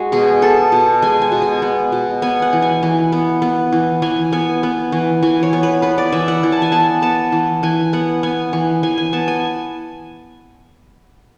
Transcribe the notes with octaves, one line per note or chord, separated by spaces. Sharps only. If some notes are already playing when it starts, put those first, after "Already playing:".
Already playing: G#3 F#4
B2 G#4
B3 A4
B2
G#3 G#5
G#5
B2
G#5
B3
B2
B3 G#5
F#5
E3
G#5
E3
B3
B3
E3
E3 G#5
B3 G#5
B3
E3
E3 G#5
C#5
B3
B4
B3 B4
D5
E3 E5
F#5
E3
A5
G#5
B3 A5
B3 A5
E3
E3 G#5
B3 F#5
B3 G#5
E3
E3 G#5
G#5
B3 A5
G#5